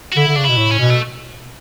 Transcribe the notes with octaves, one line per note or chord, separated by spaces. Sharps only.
F#4
D3 E4
D3
C#3 D4
B2 E4
A2
C#4
B2
A3